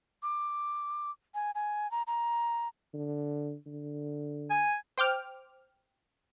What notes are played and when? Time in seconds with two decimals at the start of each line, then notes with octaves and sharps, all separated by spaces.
0.23 D6
1.34 G#5
1.55 G#5
1.91 A#5
2.07 A#5
2.94 D3
3.66 D3
4.50 G#5
4.98 C5 G5 D6 F6